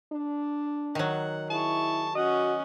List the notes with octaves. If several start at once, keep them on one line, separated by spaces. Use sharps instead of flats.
D4
D#3 F#3 F#5
E4 G#4 A5 C#6
C#4 F#4 D#5 F#5